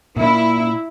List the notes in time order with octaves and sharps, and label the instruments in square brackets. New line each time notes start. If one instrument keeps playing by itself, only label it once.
[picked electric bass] A#2 A#3 [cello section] E4